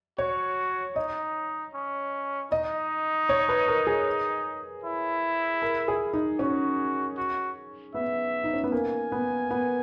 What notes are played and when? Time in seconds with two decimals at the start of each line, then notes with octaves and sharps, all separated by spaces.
0.18 F#4 C#5
0.96 D#4 D#5
1.74 C#4
2.52 D#4 D#5
3.29 C#5
3.49 B4
3.68 A#4
3.87 G#4
4.84 E4
5.62 A#4
5.88 G#4
6.13 D#4
6.39 C#4 F#4
7.17 F#4
7.94 B3 E5
8.44 D#4
8.54 C#4
8.64 B3
8.72 A#3 G#5
9.12 B3
9.51 B3